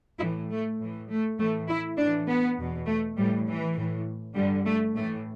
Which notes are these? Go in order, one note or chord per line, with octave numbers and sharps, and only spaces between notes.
A2 E3 E4
A3
A2 E3
A3
A2 E3 A3
E4
A2 D4
E3
B3
E2 B2
A3
A2 E3 G3
E3
A2 E3
G2 D3 G3
A3
A2 E3 A3